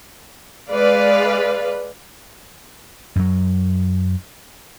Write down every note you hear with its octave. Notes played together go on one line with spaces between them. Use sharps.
G#3 B4 D5 F5
F#2 F#3